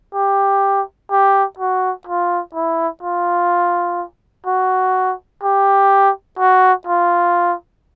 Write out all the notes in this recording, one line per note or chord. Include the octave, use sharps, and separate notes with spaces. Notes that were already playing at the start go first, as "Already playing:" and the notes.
G4
G4
F#4
F4
E4
F4
F#4
G4
F#4
F4